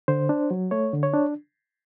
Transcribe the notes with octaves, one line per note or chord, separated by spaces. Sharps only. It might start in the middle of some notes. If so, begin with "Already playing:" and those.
D3 C5
D4
F#3
A3 C#5
D3
C#5
D4